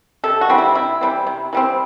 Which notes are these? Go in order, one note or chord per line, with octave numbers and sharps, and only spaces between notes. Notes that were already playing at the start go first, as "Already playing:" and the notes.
C3 A4
F#4
E3 G3 C4
E4
C3 E4
E3 G3 C4
C3
E3 G3 C4